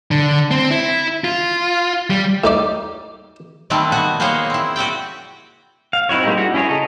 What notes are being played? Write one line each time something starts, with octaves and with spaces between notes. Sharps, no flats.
D3
C4
E4
F4
G3
A2 D#4 D5
B2 D#3 G3 A3 B3 C4
B3 F#4 G#5
A#3 B3 G#4 C5 C#5 D#5
C4 E4
F#4 G4 D5 G5
F5
C4 D#4 E4 F#4 C#5
G3 G#3 A#3 D#4 G4
D4 E4 F#4
C#4 E4 G#4 C#5
C#3 A4 D#5 A#5